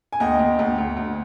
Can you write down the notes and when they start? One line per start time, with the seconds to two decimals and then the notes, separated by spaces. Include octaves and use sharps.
0.12 G#5
0.20 D2 D#5 G5
0.39 D2
0.59 D2
0.78 D2
0.97 D2